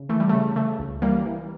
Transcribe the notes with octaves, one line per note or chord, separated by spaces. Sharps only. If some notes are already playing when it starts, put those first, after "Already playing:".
Already playing: C#3
E3 A3
G3
C#3 A3
C#3 A3
C#2
E3 G3 A#3
E3